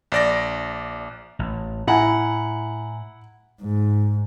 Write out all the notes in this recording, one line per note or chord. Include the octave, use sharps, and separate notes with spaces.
A#1 D5 A#6
A1
A2 E4 E5 F#5 G#5 A#5
G#2